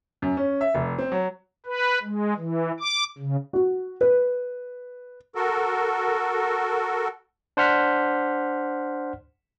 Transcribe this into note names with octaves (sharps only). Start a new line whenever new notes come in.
F#2
C#4
E5
F1
C4
F#3
B4
G#3
E3
D6
C#3
F#4
B4
F#4 A4 A#4
D4 C5 F#5 F6 B6